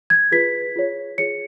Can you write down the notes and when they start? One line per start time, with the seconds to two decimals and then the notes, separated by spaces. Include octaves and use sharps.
0.10 G#6
0.31 F4 G#4 B4 B6
0.76 F4 G#4 C#5
1.18 F4 G#4 C#5 C#7